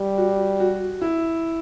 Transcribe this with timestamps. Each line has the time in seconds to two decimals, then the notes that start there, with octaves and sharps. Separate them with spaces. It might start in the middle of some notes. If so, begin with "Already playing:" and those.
Already playing: G3
0.18 F#4
0.60 F#4
1.01 E4